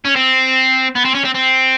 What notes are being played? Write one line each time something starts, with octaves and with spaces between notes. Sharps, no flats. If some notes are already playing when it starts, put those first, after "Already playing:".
C#4
C4
B3
C4
C#4
C4
C4